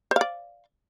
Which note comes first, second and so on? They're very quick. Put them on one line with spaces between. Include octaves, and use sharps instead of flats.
C5 F5 D5